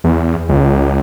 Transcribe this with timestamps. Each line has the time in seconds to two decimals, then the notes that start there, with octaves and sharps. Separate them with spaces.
0.04 E2
0.49 C#2